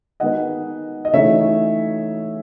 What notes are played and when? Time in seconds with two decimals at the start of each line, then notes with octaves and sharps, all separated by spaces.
0.20 D#3 G#3 B3 D#5 F#5
1.05 D#5
1.14 C#3 E3 A3 D#4 C#5 E5